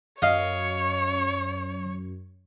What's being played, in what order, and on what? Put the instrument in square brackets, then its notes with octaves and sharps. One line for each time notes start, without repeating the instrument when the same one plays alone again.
[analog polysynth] F#2 [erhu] C#5 [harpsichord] D#5 F5